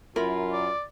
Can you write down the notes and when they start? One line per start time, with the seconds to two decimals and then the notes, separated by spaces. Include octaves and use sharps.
0.16 F#2 E4 F4 A#4 B5
0.52 D5